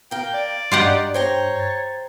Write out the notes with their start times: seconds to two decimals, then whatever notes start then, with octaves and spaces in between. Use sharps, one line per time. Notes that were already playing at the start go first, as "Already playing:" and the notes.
0.11 A#3 A#4 G5
0.34 D5
0.71 G2 D#4 F4 G4 F#5
1.14 C5 C#5 G5 A#5
1.56 G#6 A6